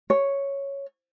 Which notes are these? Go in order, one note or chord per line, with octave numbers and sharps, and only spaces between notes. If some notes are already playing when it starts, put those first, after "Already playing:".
C#5